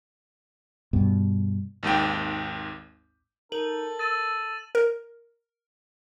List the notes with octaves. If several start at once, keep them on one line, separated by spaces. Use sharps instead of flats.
G2 B2
G#1 D#2 G#2 G5
D#4 A4 A#4 F#7
E6 A6 D#7
A#4